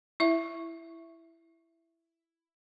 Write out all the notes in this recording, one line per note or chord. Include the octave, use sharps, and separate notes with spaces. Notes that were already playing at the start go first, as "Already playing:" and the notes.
E4 E5